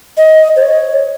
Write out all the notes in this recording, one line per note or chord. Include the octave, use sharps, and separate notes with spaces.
D#5
C5
C#5